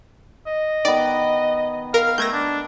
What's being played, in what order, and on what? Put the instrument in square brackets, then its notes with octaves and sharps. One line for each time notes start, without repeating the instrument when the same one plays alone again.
[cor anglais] D#5
[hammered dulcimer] D#3 B3 [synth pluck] D5
[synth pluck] A#4 [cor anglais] F5
[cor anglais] A3 [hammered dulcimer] A#4 [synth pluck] G6 G#6 A#6
[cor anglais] D4